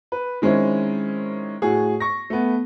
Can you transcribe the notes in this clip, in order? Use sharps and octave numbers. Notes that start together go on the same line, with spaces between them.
B4
D#3 G#3 C4 C#4 E4
A2 F#4 G#4
C#6 A#6
A3 B3